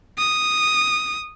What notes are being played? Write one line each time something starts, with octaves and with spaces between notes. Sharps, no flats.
D#6